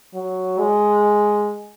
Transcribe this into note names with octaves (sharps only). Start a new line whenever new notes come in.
F#3
G#3